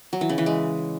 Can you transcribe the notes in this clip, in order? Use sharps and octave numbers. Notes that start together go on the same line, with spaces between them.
F#3
E3
C#3
E3
G#3